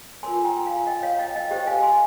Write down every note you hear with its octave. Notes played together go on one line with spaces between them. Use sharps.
F4 A#4 C#5 G#5 C6
G5 A#5
F5 G#5
D#5 G5
C#5 F5
D#5 G5
D#5 G5
G4 C5 D#5 G5
F5 G#5
G#5 C6